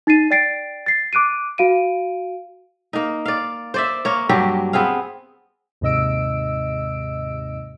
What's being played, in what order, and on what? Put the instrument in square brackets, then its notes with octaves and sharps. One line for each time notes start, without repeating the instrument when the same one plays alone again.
[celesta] D#4 A6 C7 D#7
D5 G5 A6 C7 D7
A6 C7
D6 F#6 D7 D#7
F#4 F5 D7 D#7
[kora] A#3 D#4
D5 F5
C5 D5 E5
A#3 C#5
G2 F#3 A#3 G4
B3 C4 G#4 F5
[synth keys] D#2 G#2 C3 D#5 E6 D7